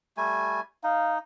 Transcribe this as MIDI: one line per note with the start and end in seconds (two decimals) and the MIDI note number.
0.17 0.60 55
0.17 0.60 57
0.17 0.60 80
0.84 1.18 63
0.84 1.18 77